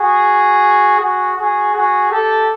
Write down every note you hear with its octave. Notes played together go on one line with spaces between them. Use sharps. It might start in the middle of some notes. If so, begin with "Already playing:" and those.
Already playing: F#4 G#4
F#4 G#4
F#4 G#4
F#4 G#4
G4 A4